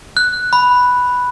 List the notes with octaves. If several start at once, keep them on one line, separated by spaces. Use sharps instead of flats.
F#6
B5